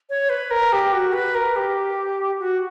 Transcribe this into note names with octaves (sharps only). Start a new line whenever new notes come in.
C#5
B4
A#4
G4
F#4
B4
A#4
G4
F#4